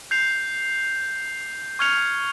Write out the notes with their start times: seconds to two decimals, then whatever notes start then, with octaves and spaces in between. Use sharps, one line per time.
0.11 G6 C7 F7
1.79 C#6 F6 G#6 C#7 F7